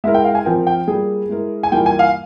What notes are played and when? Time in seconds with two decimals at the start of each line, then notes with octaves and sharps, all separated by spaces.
0.04 G#3 E4 A#4 E5
0.14 G5
0.24 F5
0.35 G#5
0.45 F3 C4 F4 A#4 G5
0.67 G5
0.88 G3 A#3 F4 G#4
1.29 G#3 E4 A#4
1.63 G#5
1.71 E3 G3 A#3 F4 A#4 G5
1.86 G#5
1.99 F5